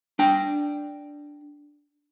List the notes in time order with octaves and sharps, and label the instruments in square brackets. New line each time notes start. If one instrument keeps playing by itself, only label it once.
[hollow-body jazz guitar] D4 G5